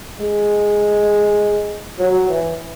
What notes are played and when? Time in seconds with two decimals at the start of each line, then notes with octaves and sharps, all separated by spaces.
0.20 G#3
1.99 F#3
2.28 E3